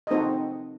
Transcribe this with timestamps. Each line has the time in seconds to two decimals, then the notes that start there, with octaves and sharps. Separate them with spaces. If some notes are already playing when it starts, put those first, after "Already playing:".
0.07 D#5
0.11 C4 D#4 F#4 A4 C5